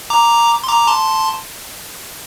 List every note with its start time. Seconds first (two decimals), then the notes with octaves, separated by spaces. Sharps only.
0.10 A#5 D6
0.64 C6
0.68 A#5 D6
0.87 A5 C6